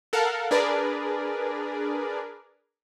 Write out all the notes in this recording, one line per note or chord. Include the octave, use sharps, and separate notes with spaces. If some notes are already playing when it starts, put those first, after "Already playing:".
A4 A#4 F5 F#5
D4 G#4 A#4 B4 D5